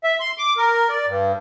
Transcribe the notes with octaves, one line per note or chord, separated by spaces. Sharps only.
E5
C6
D6
A#4
D5
G2